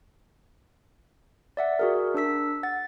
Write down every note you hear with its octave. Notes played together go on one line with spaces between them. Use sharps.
D5 E5 F#5
F#4 G#4 A#4
D4 A#4 E6 B6
F#5 A6